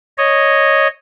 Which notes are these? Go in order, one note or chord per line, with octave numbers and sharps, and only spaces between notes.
C#5 D#5